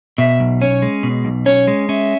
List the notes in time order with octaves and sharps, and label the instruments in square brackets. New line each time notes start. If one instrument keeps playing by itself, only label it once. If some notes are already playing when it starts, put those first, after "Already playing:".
[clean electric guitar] B2 [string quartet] E5
[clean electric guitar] B1
[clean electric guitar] C#4 [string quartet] C#5
[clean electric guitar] G#3
B2
B1
[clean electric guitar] C#4 [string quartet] C#5
[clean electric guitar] G#3
[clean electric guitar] C#4 [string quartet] E5